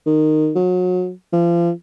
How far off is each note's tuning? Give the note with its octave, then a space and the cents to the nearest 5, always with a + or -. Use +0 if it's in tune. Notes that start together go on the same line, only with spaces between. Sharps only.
D#3 -15
F#3 -30
F3 -35